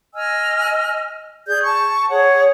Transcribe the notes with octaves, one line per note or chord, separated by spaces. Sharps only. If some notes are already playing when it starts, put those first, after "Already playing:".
D#5 G#5 E6 F6
G#4 D5 G6
A5 C#6
G#4 C#5 F#5